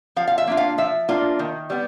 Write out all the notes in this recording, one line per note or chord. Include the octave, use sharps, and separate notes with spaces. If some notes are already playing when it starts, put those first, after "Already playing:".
F3 F5
F5
E5
A#3 D4 F4
F5
F3 E5
A#3 D4 F4
D#3
G3 B3